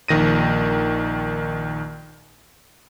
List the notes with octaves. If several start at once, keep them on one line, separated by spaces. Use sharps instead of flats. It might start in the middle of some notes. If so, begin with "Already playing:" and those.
A#1 D#3 A#6 D#7